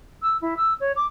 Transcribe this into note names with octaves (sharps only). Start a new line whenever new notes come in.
E6
E4
E6
C#5
D6